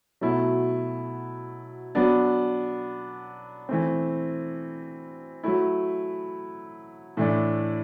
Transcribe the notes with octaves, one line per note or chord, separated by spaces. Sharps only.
B2 F#3 A3 E4
F#3 B3 D4
E3 A3 C4
F#3 A3 E4
A2 E3 A3 D4